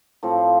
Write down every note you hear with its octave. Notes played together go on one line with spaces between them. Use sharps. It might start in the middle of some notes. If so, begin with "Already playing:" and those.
A2 F3 C4